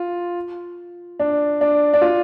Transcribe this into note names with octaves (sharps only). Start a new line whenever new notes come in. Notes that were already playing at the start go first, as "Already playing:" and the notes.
Already playing: F4
D4
D4
D4
F4